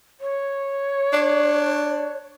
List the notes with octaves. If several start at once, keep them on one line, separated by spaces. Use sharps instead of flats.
C#5
D4